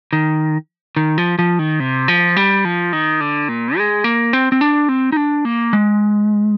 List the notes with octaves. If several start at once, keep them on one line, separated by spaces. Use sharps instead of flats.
D#3
D#3
F3
F3
D#3
C3
F3
G3
F3
D#3
D3
A#2
G#3
A#3
C4
C4
D4
C4
D#4
D4
A#3
G#3